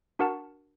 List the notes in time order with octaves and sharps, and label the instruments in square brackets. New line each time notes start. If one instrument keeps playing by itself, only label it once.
[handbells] D4 F#4 A#4 F#5 A5